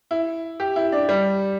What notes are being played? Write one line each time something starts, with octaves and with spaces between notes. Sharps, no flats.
E4
G4
E4
D4
G3